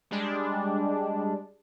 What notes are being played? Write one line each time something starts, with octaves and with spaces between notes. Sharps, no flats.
G3 G#3 D4